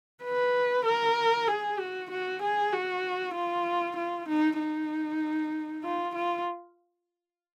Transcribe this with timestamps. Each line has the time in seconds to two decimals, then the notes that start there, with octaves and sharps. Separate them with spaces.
0.24 B4
0.85 A#4
1.47 G#4
1.78 F#4
2.10 F#4
2.42 G#4
2.73 F#4
3.35 F4
3.97 F4
4.28 D#4
4.59 D#4
5.84 F4
6.15 F4